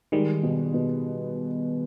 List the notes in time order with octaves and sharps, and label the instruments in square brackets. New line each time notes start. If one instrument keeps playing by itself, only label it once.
[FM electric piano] D#3 G3 [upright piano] G#3
[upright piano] B2
B2